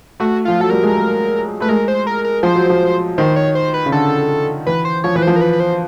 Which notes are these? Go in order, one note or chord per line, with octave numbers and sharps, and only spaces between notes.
A3 F#4
F3 F4
F#3 A4
G3 A#4
G#3
A3
A3 B4
G#3 A#4
C5
A#4
A#4
F3 C5
F#3
F3
D#3 C5
C#5
C5
B4
C#3
D3 A4
E3 B4
C5
F3 C#5
E3 B4
F3 C5
A#4
B4
B4
C5